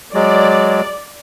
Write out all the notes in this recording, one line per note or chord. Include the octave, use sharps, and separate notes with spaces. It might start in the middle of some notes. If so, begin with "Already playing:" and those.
F#3 G#3 D5